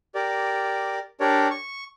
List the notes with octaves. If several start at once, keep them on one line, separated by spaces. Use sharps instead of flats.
G4 A#4 D5
D4 G4 A#4 C#5 D5
C#6